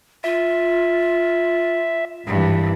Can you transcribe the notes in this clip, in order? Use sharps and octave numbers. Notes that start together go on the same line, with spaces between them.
F4 E5
G#1 G2 E3